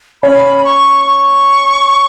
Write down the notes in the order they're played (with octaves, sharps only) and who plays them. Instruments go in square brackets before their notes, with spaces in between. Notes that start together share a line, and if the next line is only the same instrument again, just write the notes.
[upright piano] C#4 C#5 [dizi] B5
[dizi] B5
C#6
C#6